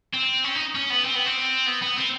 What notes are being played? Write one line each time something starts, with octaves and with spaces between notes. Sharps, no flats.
C4
C#4
D#4
C#4
B3
C4
B3
C4
B3
B3
C4